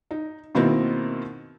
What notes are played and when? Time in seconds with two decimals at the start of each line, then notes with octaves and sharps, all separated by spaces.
0.11 D#4
0.55 B2 D#3 A#3 C4 E4 A#4